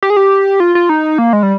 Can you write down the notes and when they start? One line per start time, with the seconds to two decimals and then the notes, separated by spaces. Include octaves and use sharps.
0.03 G4
0.10 G#4
0.17 G4
0.60 F4
0.75 F4
0.89 D#4
1.18 A#3
1.33 G#3
1.43 G3